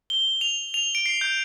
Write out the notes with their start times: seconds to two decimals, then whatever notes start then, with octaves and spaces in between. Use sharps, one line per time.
0.10 G7
0.41 F7
0.74 F7
0.95 D7
1.06 C7
1.21 G6